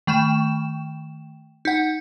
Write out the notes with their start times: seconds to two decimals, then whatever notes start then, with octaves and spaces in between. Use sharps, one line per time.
0.07 D#3 A3 G5 E7
1.65 D#4 F#5